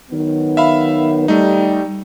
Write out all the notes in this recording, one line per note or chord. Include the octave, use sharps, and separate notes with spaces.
D#3 F#3 B3
E5 F5 B5
G3 A3 D#4